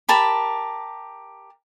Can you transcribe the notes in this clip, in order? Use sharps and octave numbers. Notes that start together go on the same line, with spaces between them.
G4 A#4 A5 B5